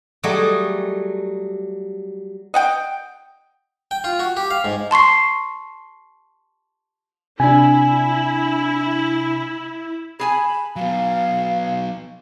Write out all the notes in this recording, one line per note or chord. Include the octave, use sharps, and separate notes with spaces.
F#3 G3 A3 G#4 D#5
D#5 F#5 G5
G5
F4
F#4
G4
F5
G#2
A5 C6 C#6 C7
C3 D4 E4 G#5
G#4 G#5 A5 B5
F#3 B3 F5